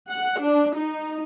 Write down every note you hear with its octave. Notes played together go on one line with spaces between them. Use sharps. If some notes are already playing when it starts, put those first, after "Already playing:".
F#5
D4
D#4